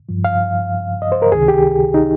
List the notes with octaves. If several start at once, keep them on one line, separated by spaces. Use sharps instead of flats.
G2 F3
F5
D#5
C5
A#4
C#2 C3 D#3 G#4
G4
D#4